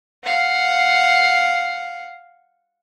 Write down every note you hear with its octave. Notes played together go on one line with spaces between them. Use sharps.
F5 F#5